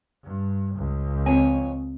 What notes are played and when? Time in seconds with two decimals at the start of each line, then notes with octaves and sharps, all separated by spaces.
0.24 G2
0.76 C#2
1.26 F2 C4 C#5 G#5